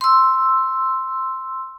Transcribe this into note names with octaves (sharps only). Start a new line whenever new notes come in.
C6 E6